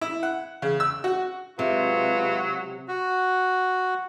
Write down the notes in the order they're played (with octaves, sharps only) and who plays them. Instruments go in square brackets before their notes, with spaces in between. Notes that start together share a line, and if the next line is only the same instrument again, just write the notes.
[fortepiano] E4
F#5
C#3
E6
F#4
[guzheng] C3 [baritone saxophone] F#3 [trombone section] G#3 F4 B4
[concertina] F#4